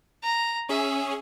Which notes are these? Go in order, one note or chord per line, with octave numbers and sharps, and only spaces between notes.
A#5
C#4 G#4 E5